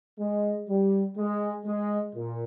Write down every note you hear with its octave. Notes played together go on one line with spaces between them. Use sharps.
G#3
G3
G#3
G#3
A#2